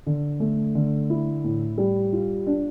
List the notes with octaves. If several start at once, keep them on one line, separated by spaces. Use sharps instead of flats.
D3
A3
D3
E4
A2
G3
F4
D4